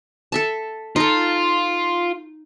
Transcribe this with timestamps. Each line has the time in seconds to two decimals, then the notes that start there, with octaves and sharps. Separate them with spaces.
0.32 A4 E5 A5
0.96 D#4 F4 A4